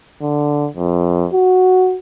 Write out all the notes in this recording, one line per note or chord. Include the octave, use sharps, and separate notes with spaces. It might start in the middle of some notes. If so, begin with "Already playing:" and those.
D3
F2
F#4